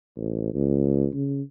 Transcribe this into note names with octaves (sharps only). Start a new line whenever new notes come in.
A1
C#2
C#3